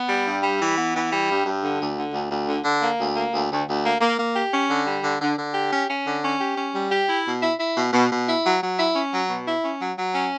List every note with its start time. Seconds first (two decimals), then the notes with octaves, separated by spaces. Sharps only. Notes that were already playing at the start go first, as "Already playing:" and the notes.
Already playing: B3
0.09 G3
0.26 G2
0.43 G3
0.61 E3
0.78 B3
0.95 E3
1.11 G3
1.29 G2
1.45 G2
1.62 D3
1.80 D2
1.97 D3
2.13 D2
2.31 D2
2.47 D3
2.65 D3
2.82 A#3
3.00 D2
3.16 A#3
3.34 D2
3.51 D2
3.67 D2
3.85 A#3
4.01 A#3
4.18 A#3
4.35 G4
4.52 C#4
4.69 D3
4.86 G3
5.03 D3
5.21 D3
5.38 D3
5.54 G4
5.72 C#4
5.89 C#4
6.06 D3
6.23 C#4
6.39 G4
6.57 C#4
6.73 G3
6.91 G4
7.08 E4
7.26 B2
7.42 E4
7.59 E4
7.76 B2
7.93 B2
8.10 B2
8.27 E4
8.44 F#3
8.62 F#3
8.78 E4
8.95 C#4
9.13 F#3
9.29 B2
9.47 E4
9.63 C#4
9.80 F#3
9.97 F#3
10.14 C#4